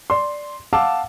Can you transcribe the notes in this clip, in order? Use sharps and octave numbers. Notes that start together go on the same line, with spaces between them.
D5 C6
F5 F#5 A5 D6 E6